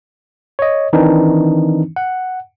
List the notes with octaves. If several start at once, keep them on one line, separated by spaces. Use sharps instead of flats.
C#5 D#5
D#3 E3 C4 D4 D#4
F#5